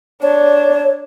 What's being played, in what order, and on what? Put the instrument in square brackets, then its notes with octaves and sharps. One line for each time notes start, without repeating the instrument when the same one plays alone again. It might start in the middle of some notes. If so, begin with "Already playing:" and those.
[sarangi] D4 [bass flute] C#5